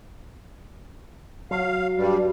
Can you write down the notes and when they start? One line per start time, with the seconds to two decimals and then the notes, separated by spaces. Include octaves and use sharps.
1.51 F#3 F5
1.97 G2 G3